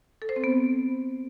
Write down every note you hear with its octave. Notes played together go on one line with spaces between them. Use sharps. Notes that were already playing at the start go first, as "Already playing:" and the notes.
A4
C5
C4
B3